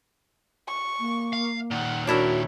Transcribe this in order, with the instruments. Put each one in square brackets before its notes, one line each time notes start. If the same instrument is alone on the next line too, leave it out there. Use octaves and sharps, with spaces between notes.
[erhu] C#6
[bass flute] A#3
[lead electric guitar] F5
[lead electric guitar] A#2 D#3 [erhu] F#5
[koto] D4 E4 A#4 [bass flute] F#4 [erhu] C#5